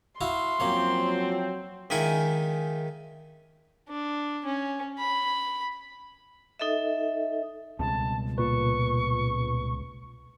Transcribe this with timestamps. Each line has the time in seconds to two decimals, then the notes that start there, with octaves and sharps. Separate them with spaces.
0.21 E4 F#4 F5 C6
0.60 F#2 F3 F#3 A#3 C4 C#5
1.90 C#2 D#3 D#4 E4 G#5
3.89 D4
4.45 C#4
4.99 B5
6.59 D#4 A4 D#5 E5
7.79 C#2 B2 G3 C4 A5
8.38 A#2 B4 C#6